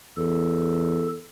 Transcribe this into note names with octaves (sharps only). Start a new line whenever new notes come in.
E2 A4